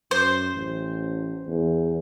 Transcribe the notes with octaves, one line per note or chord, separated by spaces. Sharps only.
F#2 C5
A1
E2